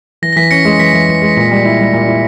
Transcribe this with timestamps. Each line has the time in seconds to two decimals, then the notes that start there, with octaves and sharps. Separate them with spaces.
0.22 E3 A#6
0.33 A#6
0.36 E3 B6
0.51 C#4 A#6 C#7
0.65 G#3
0.79 E3 B6
0.94 E3
1.09 E3
1.22 G#3
1.37 A#2
1.51 G3
1.65 E4
1.79 G3
1.93 A#2
2.07 E4